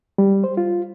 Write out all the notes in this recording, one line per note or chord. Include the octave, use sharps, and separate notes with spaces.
G3
C5
F4